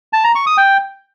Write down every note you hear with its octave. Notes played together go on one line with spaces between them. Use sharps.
A5
A#5
C#6
D#6
G5